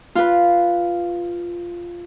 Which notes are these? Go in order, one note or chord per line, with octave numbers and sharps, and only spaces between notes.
F4 B4